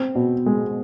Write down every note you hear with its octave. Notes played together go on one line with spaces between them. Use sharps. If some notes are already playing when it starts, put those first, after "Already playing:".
Already playing: C4
B2
G#3